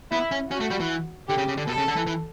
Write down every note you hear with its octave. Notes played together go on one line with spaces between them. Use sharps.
B3 E4
C#4
C#4 F#4
A3
G3
E3
D3 G4
C#3
C#3
D3
B2 A4
C#3
D3
E3
E3